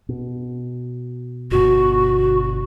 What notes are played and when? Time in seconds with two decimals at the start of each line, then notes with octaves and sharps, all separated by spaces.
0.09 B2
1.51 G1 B2 F#4